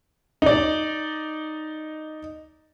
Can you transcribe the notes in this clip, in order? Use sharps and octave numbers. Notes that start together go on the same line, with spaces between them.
D#4 D5